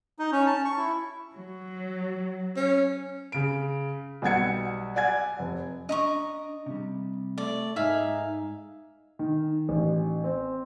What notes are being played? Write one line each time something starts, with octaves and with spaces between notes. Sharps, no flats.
D#4
C#4
A5
C#6
E4
F#3
C#4
C#3 D7
B1 G3 F#5 G#6 C#7
D5 F#5 G#5 G#6
F1
D4 D#5 A#5 C#6
C3 G3
A3 D5
G#2 D#4 E5 F5 G#5
D#3
A1
C4